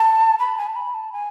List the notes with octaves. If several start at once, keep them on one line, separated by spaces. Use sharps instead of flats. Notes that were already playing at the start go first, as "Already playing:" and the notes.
Already playing: A5
B5
G#5
A5
B5
A5
G#5